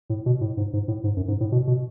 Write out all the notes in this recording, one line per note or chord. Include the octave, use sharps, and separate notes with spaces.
A2
B2
A2
G#2
G#2
A2
G#2
F#2
G#2
A2
B2
B2